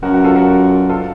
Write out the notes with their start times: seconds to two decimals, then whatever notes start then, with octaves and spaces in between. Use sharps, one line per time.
0.03 F#2 F#4 A#4
0.14 F#4
0.24 F4 A4
0.36 F#4 A#4
0.89 F4 A4